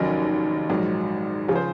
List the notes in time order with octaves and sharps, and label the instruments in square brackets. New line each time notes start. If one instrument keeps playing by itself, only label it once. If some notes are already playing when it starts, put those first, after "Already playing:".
Already playing: [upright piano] F1 D#2 D#3 F#3 C#4 D#5
A#1 G#2 D#3 F#3
C#3 F3 C#5
C5